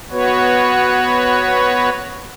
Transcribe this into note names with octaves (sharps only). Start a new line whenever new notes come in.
B3 F#4 B4 C#5